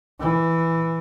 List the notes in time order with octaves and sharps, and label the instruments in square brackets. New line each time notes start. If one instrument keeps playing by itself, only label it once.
[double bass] E3